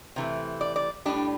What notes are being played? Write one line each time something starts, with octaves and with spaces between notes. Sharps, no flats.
C3 E3 A3
D5
D5
A2 G3 D4